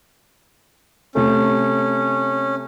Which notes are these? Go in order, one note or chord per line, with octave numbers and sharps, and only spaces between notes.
C3 A3 C#4